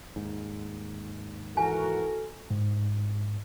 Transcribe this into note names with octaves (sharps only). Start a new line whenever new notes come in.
D#2 G#2
E3 F#4 A4 A#4 G#5
G#2